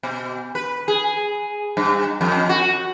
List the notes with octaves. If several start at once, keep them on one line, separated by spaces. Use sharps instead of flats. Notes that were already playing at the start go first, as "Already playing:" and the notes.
B2
B4
G#4
G2
F2
F#4